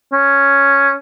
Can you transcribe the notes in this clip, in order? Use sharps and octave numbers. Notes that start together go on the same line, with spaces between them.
C#4